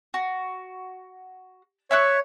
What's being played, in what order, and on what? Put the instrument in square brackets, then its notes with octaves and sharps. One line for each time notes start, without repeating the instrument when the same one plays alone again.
[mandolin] F#4
[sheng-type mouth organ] C#5 [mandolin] E5 C#6 F#6